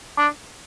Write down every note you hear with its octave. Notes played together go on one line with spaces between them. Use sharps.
D4